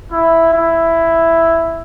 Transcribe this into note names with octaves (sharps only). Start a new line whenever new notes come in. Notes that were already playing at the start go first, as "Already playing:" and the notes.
E4
E4